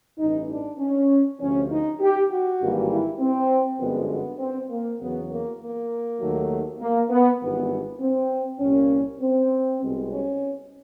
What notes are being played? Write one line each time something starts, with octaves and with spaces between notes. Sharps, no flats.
A1 G2 E3 D#4
D4
C#4
D2 C3 F3 C#4
D#4
G4
F#4
G#1 G2 E3 G3 A#3
E4
C4
G1 F#2 D3 F3 G#3 B3
B3
C4
A#3
E2 C#3 F#3 B3
A#3
A#3
D#2 D#3 F#3 A3
A#3
B3
G#1 G2 E3 B3
C4
C2 A#2 G3 A#3 C#4
C4
C2 B2 G#3
C#4